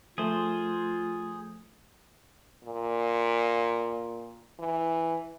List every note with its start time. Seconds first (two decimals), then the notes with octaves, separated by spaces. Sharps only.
0.18 F3 A3 F4 G#4 C5
2.64 A#2
4.59 E3